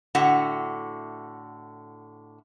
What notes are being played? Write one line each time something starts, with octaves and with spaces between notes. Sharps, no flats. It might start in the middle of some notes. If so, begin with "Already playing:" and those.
A2 D3 F#4 E5 F#5